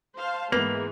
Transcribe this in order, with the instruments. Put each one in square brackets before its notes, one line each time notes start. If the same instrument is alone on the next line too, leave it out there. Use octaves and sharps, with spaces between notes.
[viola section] C5 F5 A5
[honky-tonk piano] G#2 F7 [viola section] E3 G#4 [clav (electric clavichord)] A#3 [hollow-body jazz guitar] B3